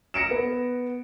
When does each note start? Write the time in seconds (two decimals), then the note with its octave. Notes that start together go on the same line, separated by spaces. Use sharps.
0.14 A#6 C#7 D7 E7
0.31 B3